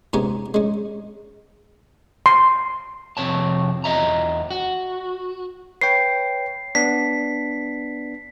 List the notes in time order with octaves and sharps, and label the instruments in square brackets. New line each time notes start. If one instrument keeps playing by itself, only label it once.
[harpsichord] G#2 C3 B3 C#4 G#5 A#5
G#3 C#4
[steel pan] C6
[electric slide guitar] F2 C3 C#5 A5
E2 D#5 E5 A#5
F#4
[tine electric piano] B4 C#5 G5 [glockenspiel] C7
[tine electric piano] B3 D4 [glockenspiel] B6